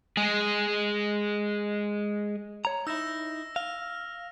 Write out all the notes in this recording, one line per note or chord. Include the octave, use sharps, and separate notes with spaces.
G#3 G#4
C#5 A#5
D#4 E4 E6 A#6 E7
F5 F6